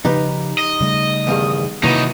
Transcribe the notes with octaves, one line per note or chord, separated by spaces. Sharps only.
C#3 F3 D#4 G4 B4
D#5
C#3 G3 A3
E2 G2 D#3
C3 D#3 E3 F#3 A#3 B3 D#4